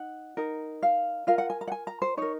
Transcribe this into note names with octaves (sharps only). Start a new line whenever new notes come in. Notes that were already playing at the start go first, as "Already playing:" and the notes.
Already playing: D#4 F#5
D#4 A#4
F5
F4 A#4 F5
F#5
G#5
A#5
F#5
G#5
A#5
C5
D#4 A#4 C#5